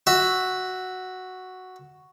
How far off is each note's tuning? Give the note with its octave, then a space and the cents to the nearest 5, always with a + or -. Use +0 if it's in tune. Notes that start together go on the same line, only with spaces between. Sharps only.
F#4 +0 E5 +0